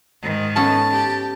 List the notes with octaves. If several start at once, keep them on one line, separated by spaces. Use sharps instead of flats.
G#2 D#3
B3 C#4 A4 A5
G4